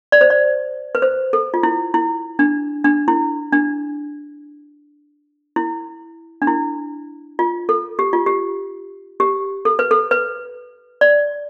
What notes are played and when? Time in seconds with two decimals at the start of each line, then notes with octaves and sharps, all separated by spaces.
0.12 D5
0.21 C5
0.30 D5
0.95 B4
1.02 C5
1.33 A4
1.54 F4
1.63 E4
1.94 E4
2.39 D4
2.84 D4
3.08 E4
3.52 D4
5.56 E4
6.42 D4
6.47 E4
7.39 F4
7.69 A4
7.99 G4
8.13 F4
8.26 G4
9.20 G4
9.65 A4
9.79 B4
9.91 A4
10.11 B4
11.01 D5